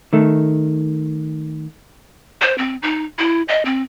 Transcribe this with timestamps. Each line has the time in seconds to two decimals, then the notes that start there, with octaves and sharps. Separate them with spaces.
0.13 D#3 A3
2.41 C5
2.58 C4
2.82 D#4
3.19 E4
3.48 D#5
3.65 C4